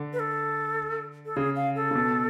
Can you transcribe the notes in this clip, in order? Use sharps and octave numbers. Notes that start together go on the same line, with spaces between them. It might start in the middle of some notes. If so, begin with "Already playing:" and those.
Already playing: D3
B4
A4
A4
C#3 G#4
F5
A4
C#3
B2